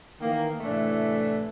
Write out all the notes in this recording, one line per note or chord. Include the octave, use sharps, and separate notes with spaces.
D#3 E3 A#3
A2 C3 E3 A3 D4